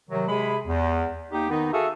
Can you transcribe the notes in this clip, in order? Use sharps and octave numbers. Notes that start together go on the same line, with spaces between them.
C3 D#3 F#3
C3 G#3 G#4 B5
E2
A#3 D#4 G4
D#3 B3 D#4
F#4 G#4 A4 E5 F5